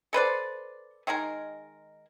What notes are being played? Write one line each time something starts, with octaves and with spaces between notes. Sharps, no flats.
A4 B4 C5 D5
D#3 G#3 G#4 A#4